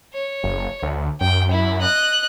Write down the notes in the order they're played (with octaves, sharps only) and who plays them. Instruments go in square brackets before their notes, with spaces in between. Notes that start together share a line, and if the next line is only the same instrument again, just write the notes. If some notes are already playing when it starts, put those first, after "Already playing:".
[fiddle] C#5
[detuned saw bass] F#1
D2
[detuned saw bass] F#2 [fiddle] G5
[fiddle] E4
D#5 F#6